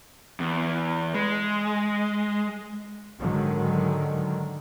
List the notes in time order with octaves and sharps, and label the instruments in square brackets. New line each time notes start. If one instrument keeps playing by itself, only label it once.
[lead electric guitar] E2
G#3
[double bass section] G#2 D3 D#3 F#3 G#3